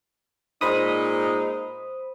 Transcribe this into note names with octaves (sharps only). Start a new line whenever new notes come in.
A#2 G#3 D#4 C5 B5 D#6